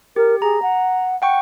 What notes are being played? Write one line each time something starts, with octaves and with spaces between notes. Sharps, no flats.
G4 A#4
G#4 A#5
F#5
F#5 G5 C#6